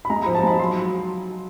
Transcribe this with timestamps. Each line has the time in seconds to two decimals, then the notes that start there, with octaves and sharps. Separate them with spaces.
0.05 B5
0.10 G#3 A#5
0.22 F3 A#5
0.35 A5
0.43 G#3 B5
0.59 F#3 C6